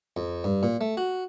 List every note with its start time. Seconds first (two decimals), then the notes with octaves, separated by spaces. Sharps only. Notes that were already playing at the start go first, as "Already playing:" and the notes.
0.17 F2
0.44 G2
0.63 A#2
0.81 A3
0.97 F#4